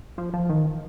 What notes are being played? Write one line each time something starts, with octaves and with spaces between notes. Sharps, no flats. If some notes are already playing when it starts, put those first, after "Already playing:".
F3
F3
D#3